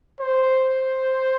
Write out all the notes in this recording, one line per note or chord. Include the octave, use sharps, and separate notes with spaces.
C5